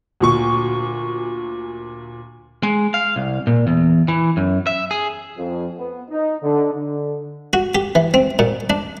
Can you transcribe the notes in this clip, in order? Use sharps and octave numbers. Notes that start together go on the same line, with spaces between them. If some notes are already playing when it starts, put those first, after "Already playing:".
D2 A#2 C#6
G#3
F5
C2
A#2
E2
E3
F#2
E5
G#4
F2
B3
D#4
D3
D3
F#4
G4
E3
C4
A#2
D4